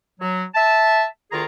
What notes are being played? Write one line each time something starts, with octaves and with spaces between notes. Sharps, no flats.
F#3
E5 A5
D2 D#3 F4 G#4 A#5